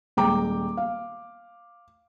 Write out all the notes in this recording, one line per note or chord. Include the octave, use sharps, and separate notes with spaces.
D#1 G#3 G5 A#5 D6
F5